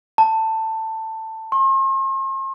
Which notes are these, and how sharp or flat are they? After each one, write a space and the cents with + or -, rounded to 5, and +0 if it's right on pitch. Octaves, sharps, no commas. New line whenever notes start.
A5 +15
C6 +45